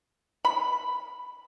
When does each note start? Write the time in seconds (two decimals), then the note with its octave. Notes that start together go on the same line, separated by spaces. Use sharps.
0.45 B5